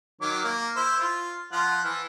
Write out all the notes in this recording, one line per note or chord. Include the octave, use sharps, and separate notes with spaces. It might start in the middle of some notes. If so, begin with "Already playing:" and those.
D#3 F#3 D6
A#3
E4 C5 E6
F4
F3 F4 F#5
E3 E4